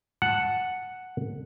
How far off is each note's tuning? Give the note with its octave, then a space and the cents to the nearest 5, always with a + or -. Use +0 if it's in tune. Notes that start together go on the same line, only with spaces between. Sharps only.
F#5 +0 A5 +0